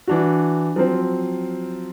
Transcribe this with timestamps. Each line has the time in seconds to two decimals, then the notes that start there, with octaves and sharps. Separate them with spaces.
0.07 E3 D4 F#4
0.76 F3 F#3 C4